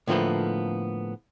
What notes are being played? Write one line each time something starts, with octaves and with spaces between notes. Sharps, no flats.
A2 D3 F3 A#3 B3 A4